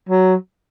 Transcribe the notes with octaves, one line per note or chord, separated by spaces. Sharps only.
F#3